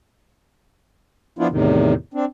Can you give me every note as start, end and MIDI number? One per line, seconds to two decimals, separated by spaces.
1.39 1.47 53
1.39 1.47 59
1.39 1.47 62
1.39 1.47 64
1.39 1.47 65
1.50 1.93 40
1.50 1.93 45
1.50 1.93 48
1.50 1.93 51
2.14 2.25 60
2.14 2.25 62